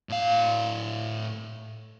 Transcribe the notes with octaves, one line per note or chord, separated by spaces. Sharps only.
A2 F5